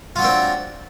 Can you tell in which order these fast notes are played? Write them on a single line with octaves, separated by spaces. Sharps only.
F4 F#3 D4 C4